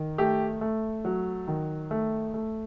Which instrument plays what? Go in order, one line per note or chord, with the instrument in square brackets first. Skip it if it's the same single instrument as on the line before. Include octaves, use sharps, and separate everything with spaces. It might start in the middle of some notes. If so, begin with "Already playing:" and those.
Already playing: [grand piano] D#3
A3 G4
A3
F#3
D#3
A3
A3